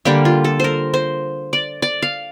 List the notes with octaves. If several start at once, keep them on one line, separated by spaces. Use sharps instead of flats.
D3 G3 A#3 G4
F4
A4
A#4 C5
C5
D5
D5
F5